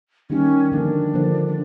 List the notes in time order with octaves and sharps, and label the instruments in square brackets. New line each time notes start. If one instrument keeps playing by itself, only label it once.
[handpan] D#3 G3 A#3 D#4 G4 [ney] C#4
[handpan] D3 F3 A#3 [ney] D4
[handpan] D3 F3 A#3
[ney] D4